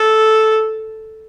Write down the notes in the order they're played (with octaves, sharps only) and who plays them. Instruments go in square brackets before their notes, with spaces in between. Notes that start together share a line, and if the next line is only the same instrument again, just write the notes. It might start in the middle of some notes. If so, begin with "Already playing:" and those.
Already playing: [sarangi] A4